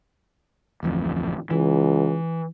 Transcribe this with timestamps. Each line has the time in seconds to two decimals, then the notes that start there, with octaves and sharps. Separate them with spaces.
0.83 D1 A1 F2
1.51 C#2 E3